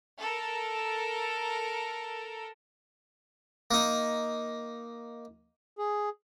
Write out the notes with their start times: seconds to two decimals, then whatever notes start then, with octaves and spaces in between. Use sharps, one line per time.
0.19 A4 A#4
3.71 A#3 D#4
5.78 G#4